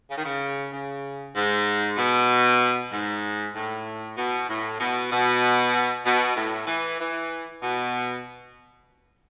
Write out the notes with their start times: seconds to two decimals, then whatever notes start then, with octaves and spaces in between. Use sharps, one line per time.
0.10 C#3
0.18 D#3
0.25 C#3
0.72 C#3
1.36 G#2
1.97 B2
2.92 G#2
3.55 A2
4.17 B2
4.49 A2
4.80 B2
5.11 B2
6.05 B2
6.37 A2
6.67 E3
6.99 E3
7.62 B2